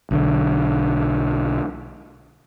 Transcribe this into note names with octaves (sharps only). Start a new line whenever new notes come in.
B1 D3